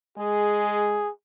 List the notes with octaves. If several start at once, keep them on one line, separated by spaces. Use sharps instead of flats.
G#3 G#4